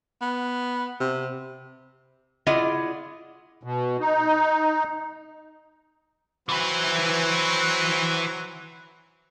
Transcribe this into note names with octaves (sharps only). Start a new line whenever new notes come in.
B3
C3
E4 F4 G#4 D5 D#5 F#5
B2
D#4
E3 F#3 C4 F#4 B4